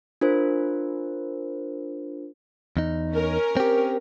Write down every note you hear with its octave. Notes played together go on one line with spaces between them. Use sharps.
D4 F4 A#4 C5
E2 D#4
C#4 A#4
C4 G4